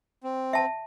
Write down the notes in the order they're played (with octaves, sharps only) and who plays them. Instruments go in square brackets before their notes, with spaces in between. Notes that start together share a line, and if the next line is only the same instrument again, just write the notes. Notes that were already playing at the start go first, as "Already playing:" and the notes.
[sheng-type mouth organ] C4
[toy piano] E5 A5